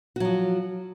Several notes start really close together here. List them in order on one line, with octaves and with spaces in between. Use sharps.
F#4 F#3 F3